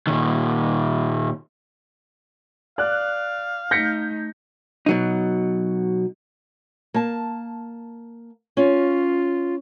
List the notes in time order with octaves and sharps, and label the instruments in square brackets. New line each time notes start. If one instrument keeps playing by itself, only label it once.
[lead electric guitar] A#2 D#3
[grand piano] D5 [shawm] F5 [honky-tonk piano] F#6
[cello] A3 D#4 [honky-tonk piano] G6 [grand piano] A#6 B6 C#7
[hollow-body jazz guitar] B2 F#3 D#4
[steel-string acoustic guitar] A#3 A5
[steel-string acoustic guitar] C#4 [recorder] F4